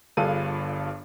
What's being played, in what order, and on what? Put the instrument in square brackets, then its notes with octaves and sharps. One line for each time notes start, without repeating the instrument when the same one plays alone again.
[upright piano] G1 G2 F4 G#4 A4 D#7